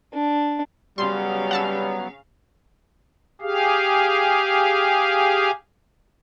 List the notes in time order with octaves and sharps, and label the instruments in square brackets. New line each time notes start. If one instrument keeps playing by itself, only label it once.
[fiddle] D4
[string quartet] C#3 F5 [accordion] F#3 B3 [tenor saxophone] G3 [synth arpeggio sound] C6
[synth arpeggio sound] F#5 A5 E6
[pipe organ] G4 G#4 F5